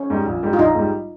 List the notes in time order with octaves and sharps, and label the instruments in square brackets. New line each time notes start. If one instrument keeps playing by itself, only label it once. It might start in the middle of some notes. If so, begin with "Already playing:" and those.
Already playing: [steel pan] C#4
[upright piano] G#2 G3
A#1
G#2 G3
[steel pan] F4
[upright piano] A#1 [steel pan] D#4
[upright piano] G#2 G3